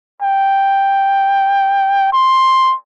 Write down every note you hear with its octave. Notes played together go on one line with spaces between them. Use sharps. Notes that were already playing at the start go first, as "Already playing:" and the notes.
G5
C6